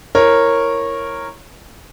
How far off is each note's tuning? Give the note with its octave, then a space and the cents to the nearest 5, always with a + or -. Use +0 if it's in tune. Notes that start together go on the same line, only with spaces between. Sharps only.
E4 +0 A#4 -5 C#5 -15